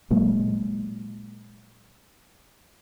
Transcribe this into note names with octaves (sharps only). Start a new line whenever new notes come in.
A#2 F#3 G#3 A#3